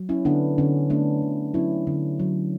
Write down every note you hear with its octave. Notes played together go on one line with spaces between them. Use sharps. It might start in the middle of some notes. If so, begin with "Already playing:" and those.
Already playing: F#3
C#4 E4
D3 B3 D4
D3 C#4
A3 B3 D4
D3
F#3 C#4 E4
D3
F#3